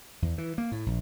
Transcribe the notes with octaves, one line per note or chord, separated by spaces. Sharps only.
E2
E3
A#3
A2
A#1